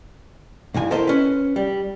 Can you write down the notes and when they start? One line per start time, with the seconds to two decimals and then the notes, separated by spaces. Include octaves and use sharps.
0.74 B1 G2 E3 G#5
0.91 E4 A4 A#4 C5 D#5
1.07 C#4 B4
1.56 G3